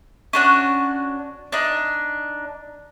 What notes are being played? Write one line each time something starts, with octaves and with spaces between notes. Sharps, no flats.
C#4 D4 F#4
D4 D#4